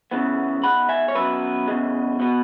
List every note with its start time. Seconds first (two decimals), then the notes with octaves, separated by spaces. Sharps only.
0.11 E2 C#3 E3 B3
0.63 G#2 G#3 B3 F#5 B5
0.89 E5 G#5
1.08 C#5
1.15 F#2 F#3 B3 B4 E5
1.68 E2 C#3 G#3
2.20 B2 B3